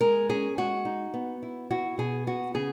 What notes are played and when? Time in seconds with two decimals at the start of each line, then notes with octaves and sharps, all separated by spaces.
0.01 G#3 A#4
0.29 C#4 G#4
0.58 G#3 F#4
0.85 D#4
1.14 B3
1.43 E4
1.70 E4 F#4
1.98 B2 G#4
2.27 B3 F#4
2.54 C#3 G#4